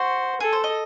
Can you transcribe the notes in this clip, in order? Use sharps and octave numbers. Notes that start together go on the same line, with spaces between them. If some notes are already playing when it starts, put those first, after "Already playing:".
Already playing: F#4 C5
G#4 A4
C5
D#5